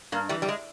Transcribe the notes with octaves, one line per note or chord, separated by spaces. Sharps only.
G2 A#3
E3 G3
G3
G#3